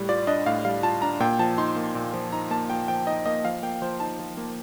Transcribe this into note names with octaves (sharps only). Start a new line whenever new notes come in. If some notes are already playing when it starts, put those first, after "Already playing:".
Already playing: A2 G3
F4 D5
D4 D#5
A2 F5
G3 F5
F4 A5
D4 A#5
A#2 G5
F3 A5
D#4 C6
A#3
A#2
F3
D#4 A#5
A#3 A5
A#2 G5
F3 G5
D#4 D#5
A#3 D#5
F3 F5
A#3 G5
F3 C5
D#4 A5
F3
A#3